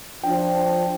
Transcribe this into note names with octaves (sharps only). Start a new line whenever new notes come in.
F3 D4 G5